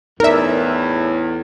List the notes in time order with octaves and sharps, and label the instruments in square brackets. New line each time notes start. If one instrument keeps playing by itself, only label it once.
[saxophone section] E2 [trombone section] A2 [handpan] D#4 D5 [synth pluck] A#4 E5